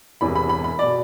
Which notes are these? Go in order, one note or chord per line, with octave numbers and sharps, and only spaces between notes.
E1 E2 C3 E3 B5
B5
B5
B5
B2 D5